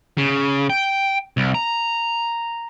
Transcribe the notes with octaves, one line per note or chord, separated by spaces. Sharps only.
C#3
G5
C2
A#5